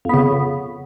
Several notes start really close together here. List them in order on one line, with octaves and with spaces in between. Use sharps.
F2 B3 C#3